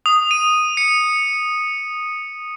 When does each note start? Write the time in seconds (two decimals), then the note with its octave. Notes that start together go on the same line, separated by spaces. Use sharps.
0.06 D#6
0.31 D#7
0.77 C#7